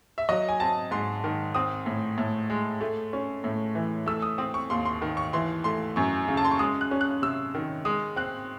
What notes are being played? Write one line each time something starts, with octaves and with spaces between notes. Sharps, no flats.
E5
F#3 D#5
G#5
C4 A5
G#2 C6
D#3
C4 D#6
A2
A2
G#3
A3
C#4
A2
E3
A3 E6
D#6
C4 D#6
C#6
D#2 C6
C6
D#3
C#6
E3 C6
A3 C6
F#2 C#6
C#3
A5
C6
C#6
G#3 D#6
F#6
C#4
F#6
C3 E6
D#3
G#3 D#6
C4 F#6